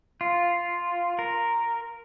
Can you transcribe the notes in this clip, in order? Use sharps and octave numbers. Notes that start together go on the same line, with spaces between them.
F4
A#4